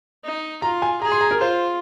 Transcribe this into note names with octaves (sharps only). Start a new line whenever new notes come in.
D#4
F4 A#5
G#5
G#4 A#5
C6
A#5
A#4
F4 C5